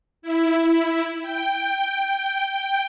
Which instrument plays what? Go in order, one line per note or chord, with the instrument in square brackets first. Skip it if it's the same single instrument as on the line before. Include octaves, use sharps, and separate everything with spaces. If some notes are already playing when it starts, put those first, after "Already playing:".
[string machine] E4
G5